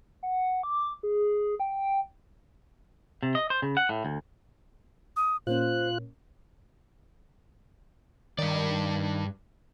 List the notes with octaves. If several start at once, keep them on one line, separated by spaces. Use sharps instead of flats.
F#5
D6
G#4
G5
C3
D#5
C5
C#3
F#5
A2
D2
D#6
A#2 A#3 C#4 F4 C5 F#6
G2 D#3 D5